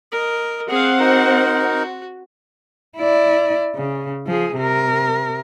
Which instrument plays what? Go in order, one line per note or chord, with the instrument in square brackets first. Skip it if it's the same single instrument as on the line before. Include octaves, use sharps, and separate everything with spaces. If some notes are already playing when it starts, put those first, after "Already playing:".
[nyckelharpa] A#4 D#5
[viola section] C4 C5 F#5 [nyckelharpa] G#4 F5
[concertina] D#4 A#4 [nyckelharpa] F#4
[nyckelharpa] F#4
[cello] E4 D5
C#3
F3 G#4
C3 A#4